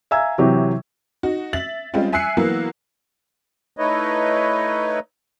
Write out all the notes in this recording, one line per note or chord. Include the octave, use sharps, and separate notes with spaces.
E5 F5 G#5 A#5 E6 G#6
C3 E3 F#3 G4 C#5
D#4 F#4
E5 A6 F#7
G3 G#3 C4 C#4 F4
E5 G#5 E6 F#6 C7 C#7
E3 F#3 A#3 B3
A3 D#4 E4 B4 C#5 D#5